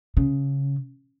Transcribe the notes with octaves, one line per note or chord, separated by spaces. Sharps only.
C#3